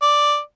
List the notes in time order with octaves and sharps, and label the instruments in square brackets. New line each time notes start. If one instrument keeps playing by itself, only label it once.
[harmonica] D5